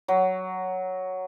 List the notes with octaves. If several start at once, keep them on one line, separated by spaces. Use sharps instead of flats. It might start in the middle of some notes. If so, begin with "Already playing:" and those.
F#3